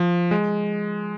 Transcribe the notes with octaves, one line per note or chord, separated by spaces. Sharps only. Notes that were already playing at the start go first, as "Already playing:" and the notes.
Already playing: F3
G#3